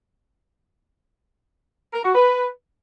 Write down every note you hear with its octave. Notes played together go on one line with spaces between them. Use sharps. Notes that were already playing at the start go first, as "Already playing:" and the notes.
A#4
F#4
B4